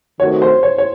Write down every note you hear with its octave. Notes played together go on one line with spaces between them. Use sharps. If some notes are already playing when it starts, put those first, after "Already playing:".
D#3 A3 C4 F#4 C#5
C5
C#5
C#5